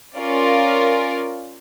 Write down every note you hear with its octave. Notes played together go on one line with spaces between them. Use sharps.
C#4 F4 A#4 D5